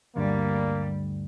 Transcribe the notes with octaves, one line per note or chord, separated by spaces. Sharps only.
D2 G2 D3 G3 A#3